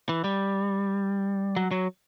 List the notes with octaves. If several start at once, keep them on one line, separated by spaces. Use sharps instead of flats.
E3
G3
F#3
F#3